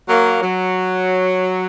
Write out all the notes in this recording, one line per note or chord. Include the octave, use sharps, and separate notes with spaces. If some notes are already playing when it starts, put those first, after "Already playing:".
F#3 A#3
F#3